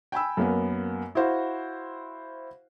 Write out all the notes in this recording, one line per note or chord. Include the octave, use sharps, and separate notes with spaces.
G5 G#5 B5 E6
F#2 A#3 B3
E4 F#4 C5 F5